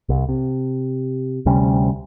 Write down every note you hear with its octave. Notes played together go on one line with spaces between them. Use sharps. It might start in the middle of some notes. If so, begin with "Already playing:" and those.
C2
C3
D2 C3 G3 C#4